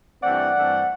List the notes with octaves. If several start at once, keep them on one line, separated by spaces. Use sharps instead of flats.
G2 E3 A3 C4 D5 F#5
G2 E3 A3 C4